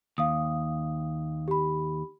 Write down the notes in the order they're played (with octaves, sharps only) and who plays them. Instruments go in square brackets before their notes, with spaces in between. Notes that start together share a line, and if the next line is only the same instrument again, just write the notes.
[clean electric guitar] D#2 [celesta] F5 D#6
[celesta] G4 B5